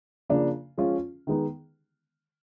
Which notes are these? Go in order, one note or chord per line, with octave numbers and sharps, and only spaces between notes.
C#3 F3 A#3 D4
F3 G#3 C#4 F4
D#3 G#3 B3 D#4